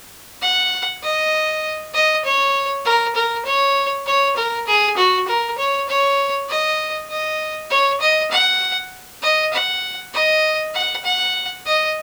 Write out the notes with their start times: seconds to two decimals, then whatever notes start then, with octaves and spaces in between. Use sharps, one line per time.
0.42 F#5
1.03 D#5
1.94 D#5
2.25 C#5
2.85 A#4
3.15 A#4
3.45 C#5
4.06 C#5
4.37 A#4
4.67 G#4
4.97 F#4
5.28 A#4
5.58 C#5
5.89 C#5
6.49 D#5
7.10 D#5
7.70 C#5
8.00 D#5
8.31 F#5
9.22 D#5
9.53 F#5
10.13 D#5
10.74 F#5
11.04 F#5
11.66 D#5